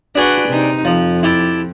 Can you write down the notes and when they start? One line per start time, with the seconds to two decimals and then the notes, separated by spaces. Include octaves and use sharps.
0.15 D4 F#4 G#4 B4 G5
0.49 C3 D#4
0.85 F2 F3
1.23 E4 G4 A5